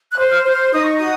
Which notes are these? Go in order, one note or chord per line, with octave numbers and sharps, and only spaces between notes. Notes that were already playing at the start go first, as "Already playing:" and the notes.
F#6
C5
F6
C5
F6
D#4 D#6
C#6
F#4 D#6